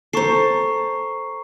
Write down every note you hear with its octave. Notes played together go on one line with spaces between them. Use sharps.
A4 C5 A#5 C#6 C7